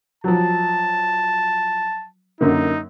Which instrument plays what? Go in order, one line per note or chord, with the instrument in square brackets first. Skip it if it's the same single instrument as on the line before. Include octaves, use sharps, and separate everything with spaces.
[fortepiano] F3 F#3 [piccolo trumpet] A5
[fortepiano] F#2 D3 A#3 [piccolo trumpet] D#4